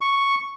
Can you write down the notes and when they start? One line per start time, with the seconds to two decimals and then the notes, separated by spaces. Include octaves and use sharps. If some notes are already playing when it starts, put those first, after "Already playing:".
0.01 C#6